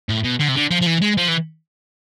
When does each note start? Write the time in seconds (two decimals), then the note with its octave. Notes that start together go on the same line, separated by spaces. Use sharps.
0.09 A2
0.24 B2
0.40 D3
0.49 C3
0.55 D3
0.71 F3
0.81 F3
0.86 E3
1.02 G#3
1.17 F3
1.28 E3